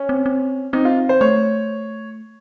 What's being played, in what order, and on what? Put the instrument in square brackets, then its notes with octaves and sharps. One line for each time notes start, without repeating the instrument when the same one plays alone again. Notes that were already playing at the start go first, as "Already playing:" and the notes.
Already playing: [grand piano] C#4
[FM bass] C4
C4
[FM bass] C4 [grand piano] D#4
[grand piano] F4
C5
[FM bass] A3 [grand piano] C#5